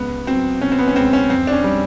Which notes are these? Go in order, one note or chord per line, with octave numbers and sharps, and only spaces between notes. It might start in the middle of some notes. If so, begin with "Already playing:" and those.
Already playing: C#2 B3
F#3 C4
B2 C#4
C4
B3
C#4
C#2 C4
C#4
F2 C4
D4
C#4
G3